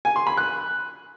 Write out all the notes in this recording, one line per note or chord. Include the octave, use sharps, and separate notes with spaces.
G#5
C6
B5
F#6